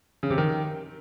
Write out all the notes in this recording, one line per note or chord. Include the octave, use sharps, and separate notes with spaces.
C#3
C3
D#3